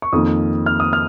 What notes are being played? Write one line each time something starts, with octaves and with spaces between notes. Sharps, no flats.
C#6
F2 D#3 A#3 D#6
F6
D#6
F6